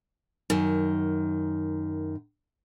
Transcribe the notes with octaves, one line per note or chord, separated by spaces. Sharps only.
F#2 D#3